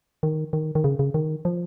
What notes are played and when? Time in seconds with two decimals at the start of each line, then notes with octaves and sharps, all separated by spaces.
0.23 D#3
0.53 D#3
0.75 D#3
0.84 C#3
0.99 C#3
1.14 D#3
1.45 F3